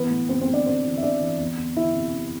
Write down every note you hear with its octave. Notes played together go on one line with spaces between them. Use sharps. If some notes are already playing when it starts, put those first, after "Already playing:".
Already playing: E3 B3 B4
A2
A2 C4 C5
C4 C5
A2
D4 D5
A2 C4 C5
E3
E5
A2 D4 D5
E3
E2
E2
E3 E4 E5
C3
C3